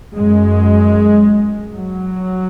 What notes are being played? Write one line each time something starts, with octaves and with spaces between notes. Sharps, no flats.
F#2 G#3
F#3